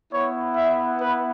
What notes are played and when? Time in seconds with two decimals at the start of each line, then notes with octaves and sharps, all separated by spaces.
0.12 B3 E4 C#5
0.56 E5
1.00 B4